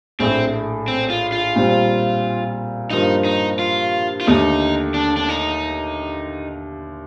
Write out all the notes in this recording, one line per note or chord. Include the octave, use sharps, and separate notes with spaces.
A#1 A2 A3 C4
C4
F4
F4
A#2 G3 C4
G2 F3 A#3 D#4
D#4
F4
F4
D#2 D3 A3 D#4
D4
D4
D#4